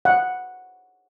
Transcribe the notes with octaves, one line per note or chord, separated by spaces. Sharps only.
F#5